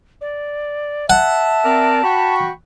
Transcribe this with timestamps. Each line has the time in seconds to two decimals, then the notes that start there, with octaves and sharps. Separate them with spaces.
0.21 D5
1.10 E5 F#5 A5
1.65 C4 A#4 D5
2.04 F#4 G5 B5 C#6